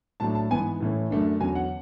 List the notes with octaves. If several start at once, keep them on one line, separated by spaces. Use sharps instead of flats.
A2 F#3 A3 D4 A5
A5
G#2 E3 B3 G#5
A2 E3 A3 C#4
F#2 D3 A3 D4
E2 D3 F#3 C#4 G#5
F#5